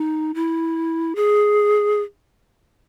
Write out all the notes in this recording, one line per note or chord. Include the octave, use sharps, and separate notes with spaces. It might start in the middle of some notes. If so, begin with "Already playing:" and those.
Already playing: D#4
E4
G#4